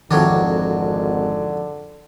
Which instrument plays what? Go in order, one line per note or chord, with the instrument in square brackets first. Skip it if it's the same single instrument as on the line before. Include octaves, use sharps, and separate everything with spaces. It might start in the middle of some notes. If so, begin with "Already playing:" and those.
[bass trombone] G#1 [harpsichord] F2 F#3 D4 [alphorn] D3 [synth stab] D#3 E4